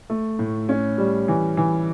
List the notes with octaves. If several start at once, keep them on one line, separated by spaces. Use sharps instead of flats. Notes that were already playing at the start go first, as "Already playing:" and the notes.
A3
A2
C#4
G3
E3
E3